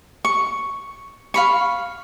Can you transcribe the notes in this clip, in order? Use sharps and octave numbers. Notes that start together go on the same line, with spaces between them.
C#6
F5 B5 C#6